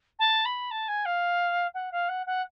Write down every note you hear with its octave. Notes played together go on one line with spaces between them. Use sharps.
A5
B5
A5
G#5
F5
F#5
F5
F#5
F#5